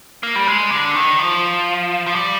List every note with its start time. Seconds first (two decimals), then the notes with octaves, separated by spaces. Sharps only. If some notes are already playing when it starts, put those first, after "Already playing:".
0.23 A#3
0.35 G3
0.47 G#3
0.71 D3
0.95 D#3
1.19 F3
2.06 F3
2.15 G3